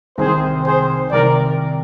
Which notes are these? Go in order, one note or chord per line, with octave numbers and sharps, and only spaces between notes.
C2 C3 D#3 G#4 C5
G#4 C5
C2 C3 D#3 A#4 D5